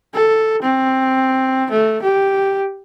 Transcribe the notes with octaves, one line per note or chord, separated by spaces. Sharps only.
A4
C4
A3
G4